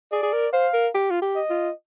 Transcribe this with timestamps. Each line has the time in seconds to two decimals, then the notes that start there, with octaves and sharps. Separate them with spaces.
0.12 G#4 D5
0.23 G#4
0.33 A#4
0.53 C5 F5
0.73 A#4
0.95 G4
1.10 F4
1.22 G4
1.36 D#5
1.50 F4